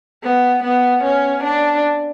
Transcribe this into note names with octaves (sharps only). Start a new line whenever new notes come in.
B3
B3
C#4
D4